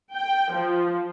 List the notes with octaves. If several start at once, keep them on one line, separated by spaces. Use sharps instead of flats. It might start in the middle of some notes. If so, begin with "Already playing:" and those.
G5
F3